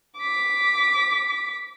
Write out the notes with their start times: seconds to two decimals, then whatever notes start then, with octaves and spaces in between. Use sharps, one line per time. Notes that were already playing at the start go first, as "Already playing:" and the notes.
0.19 D6 B6